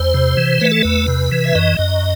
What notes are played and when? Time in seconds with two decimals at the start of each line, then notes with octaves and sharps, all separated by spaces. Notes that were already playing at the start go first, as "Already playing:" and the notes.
Already playing: E2 C5
0.14 C3
0.37 E3
0.61 A3 B4
0.72 A4
0.83 E2 B4
1.08 C3
1.31 E3
1.44 E5
1.55 F#2 D#5
1.79 F#2